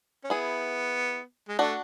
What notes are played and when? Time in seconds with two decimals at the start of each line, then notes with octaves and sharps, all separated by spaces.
0.24 C#4
0.30 B3 E4 G#4
1.49 G#3
1.59 A3 D4 F#4